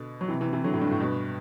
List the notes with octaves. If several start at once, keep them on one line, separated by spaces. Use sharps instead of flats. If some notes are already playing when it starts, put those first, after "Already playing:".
Already playing: B2 D3
F#3
C3 E3
C3 E3
C3 E3
D3 F#3
A2
G2
A2
G2 B2